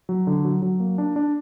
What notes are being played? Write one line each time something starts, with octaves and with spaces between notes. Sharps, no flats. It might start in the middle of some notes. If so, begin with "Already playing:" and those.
F#3
D3
F#3
F#3
A#3
D4
D4